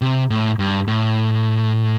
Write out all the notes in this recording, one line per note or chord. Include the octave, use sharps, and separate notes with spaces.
C3
A2
G2
A2